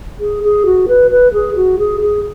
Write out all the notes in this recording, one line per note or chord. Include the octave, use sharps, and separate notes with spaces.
G#4
G#4
F#4
B4
B4
G#4
F#4
G#4
G#4